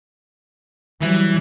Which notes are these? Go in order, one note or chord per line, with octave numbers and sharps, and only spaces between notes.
E3 F#3 G3